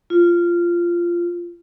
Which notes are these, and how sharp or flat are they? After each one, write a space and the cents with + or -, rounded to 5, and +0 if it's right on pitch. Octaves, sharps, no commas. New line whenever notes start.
F4 -15